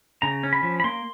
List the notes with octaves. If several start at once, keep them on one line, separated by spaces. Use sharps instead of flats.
C#3 A#5
C#4
B5
F3
B5
A#3 C6